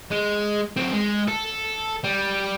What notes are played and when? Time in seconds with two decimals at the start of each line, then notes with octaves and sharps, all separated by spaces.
0.11 G#3
0.77 F#3 C4
0.93 G#3
1.28 A4
2.04 G3